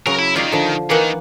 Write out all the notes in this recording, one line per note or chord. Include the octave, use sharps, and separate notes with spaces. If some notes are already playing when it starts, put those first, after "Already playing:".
C#3 F#3 A#4 A#5
E4
D#3 F4 C#5 D5
D3 F3
D#3 E3 A#3 F#5